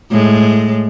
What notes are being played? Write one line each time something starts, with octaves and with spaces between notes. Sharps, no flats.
A2 G#3